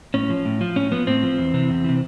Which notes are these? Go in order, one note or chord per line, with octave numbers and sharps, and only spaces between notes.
A2 C#4
F3
A2
F3
A2 C#4
F3 B3
A2 C4
F3
E2
C3 E3
E2
C3 E3